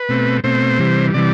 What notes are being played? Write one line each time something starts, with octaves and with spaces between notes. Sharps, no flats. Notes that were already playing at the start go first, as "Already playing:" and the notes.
Already playing: B4
B2 A3 C4
B2 A3 C4 C5
C3 E3 G3
C3 E3 G3 D5